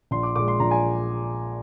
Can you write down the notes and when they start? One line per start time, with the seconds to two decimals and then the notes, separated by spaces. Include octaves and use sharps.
0.11 A#1 C6
0.23 D6
0.36 A#2 G#3 D6
0.48 C6
0.60 A#1 A#5
0.71 G#5